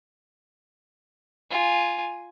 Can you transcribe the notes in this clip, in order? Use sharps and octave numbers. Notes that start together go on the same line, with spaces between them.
F4 G#5